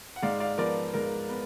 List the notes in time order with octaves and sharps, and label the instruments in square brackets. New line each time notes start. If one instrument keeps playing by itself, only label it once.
[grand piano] F#5
G#2 D5 F5
D5 F5
F3 B3 A#4 D5
G#2 A#4
B3